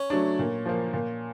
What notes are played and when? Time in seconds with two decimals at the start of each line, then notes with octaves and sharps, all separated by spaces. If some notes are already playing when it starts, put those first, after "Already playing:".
Already playing: C#4
0.10 F#3 A3 D4
0.39 A#2
0.66 F3 A#3
0.93 A#2